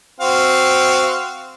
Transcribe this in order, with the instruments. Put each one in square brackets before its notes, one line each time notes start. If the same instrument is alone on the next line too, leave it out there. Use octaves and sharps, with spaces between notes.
[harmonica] C4 F#4 F5